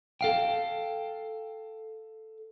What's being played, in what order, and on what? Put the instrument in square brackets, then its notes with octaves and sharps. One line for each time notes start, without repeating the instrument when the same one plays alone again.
[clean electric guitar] A4 F5 G5